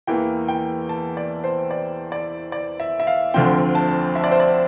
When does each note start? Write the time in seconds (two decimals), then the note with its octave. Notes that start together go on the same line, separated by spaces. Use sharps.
0.07 E2 E3 A#3 G5
0.48 G5
0.89 A5
1.17 D5
1.44 C5
1.71 D5
2.12 D5
2.52 D5
2.80 E5
3.00 E5
3.07 F5
3.34 D2 D3 F3 C4 G5
3.75 A5
4.15 E5
4.24 D5
4.31 C5
4.40 D5